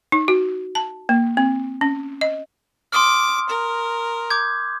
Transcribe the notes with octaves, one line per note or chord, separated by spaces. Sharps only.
D#4
F#4
A5
A#3
C4
C#4
D#5
C6 D6 D#6 F6
A#4
D6 G6 G#6